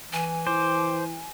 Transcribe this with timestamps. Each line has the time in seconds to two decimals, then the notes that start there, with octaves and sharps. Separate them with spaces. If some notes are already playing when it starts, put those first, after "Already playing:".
0.13 E3 G#5
0.47 E3 C5 D6